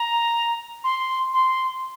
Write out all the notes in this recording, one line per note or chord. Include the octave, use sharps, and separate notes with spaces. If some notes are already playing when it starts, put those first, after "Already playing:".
Already playing: A#5
C6
C6